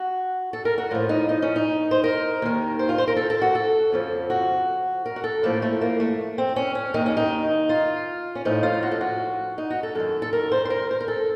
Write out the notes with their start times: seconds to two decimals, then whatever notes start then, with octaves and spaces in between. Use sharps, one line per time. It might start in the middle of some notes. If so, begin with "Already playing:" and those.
Already playing: F#4
0.53 A4
0.65 A#4
0.78 F#4
0.91 A2 F3 F4
1.09 D#4
1.29 D#4
1.42 C#4
1.56 D#4
1.91 C5
2.04 A#4
2.42 D#2 D#3
2.79 C5
2.89 F4
2.98 C5
3.07 A#4
3.16 A4
3.30 A4
3.42 F#4
3.55 A4
3.92 F2 C#3 F3
4.30 F#4
5.06 A#4
5.16 F#4
5.24 A4
5.43 A2 F3 A#3
5.62 A3
5.81 A#3
6.00 A3
6.38 C4
6.56 C#4
6.75 C#4
6.94 D#2 D#3 D#4
7.06 C#4
7.17 D#4
7.69 F4
8.35 C#4
8.45 A2 F3 D#4
8.63 F4
8.83 F#4
8.91 A4
9.01 F#4
9.58 D#4
9.70 F#4
9.83 A4
9.95 F#2 D#3 A4
10.22 A4
10.33 A#4
10.52 C5
10.65 C5
10.70 A#4
10.91 C5
11.01 A#4
11.08 A4